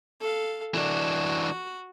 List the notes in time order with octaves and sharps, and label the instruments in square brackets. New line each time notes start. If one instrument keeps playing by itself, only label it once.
[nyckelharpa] A4 F5
[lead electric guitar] E3 D4 [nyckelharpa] F#4